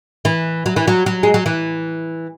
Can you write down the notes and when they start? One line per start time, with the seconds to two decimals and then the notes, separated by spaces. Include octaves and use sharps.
0.25 E3
0.66 F#3
0.76 E3
0.87 F#3
1.06 F#3
1.23 G#3
1.34 F#3
1.46 E3